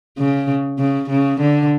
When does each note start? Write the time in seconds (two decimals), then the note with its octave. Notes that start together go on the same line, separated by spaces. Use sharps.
0.19 C#3
0.79 C#3
1.10 C#3
1.41 D3